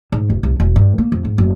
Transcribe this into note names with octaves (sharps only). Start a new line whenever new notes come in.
G#2
E1
C2
E1
G2
A#3
F2
G#2
F#1